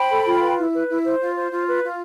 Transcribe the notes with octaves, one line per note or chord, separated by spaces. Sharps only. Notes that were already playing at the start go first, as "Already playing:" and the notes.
Already playing: C5 G5 B5
A4
F4
B4
E4
B4
E4
C5
F4
C5
F4
B4
F4